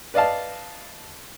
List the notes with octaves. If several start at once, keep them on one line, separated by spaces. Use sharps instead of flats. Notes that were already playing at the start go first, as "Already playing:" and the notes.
B4 D5 D#5 F5 A5